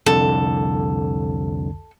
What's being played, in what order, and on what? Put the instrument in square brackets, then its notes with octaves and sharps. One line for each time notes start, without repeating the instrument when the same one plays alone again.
[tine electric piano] C2 F2 D3 [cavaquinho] A4